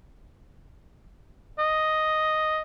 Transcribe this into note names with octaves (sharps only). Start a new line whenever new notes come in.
D#5